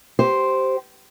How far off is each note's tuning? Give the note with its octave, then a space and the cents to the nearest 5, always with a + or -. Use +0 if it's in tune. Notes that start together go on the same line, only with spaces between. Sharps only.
G4 -20 C5 +0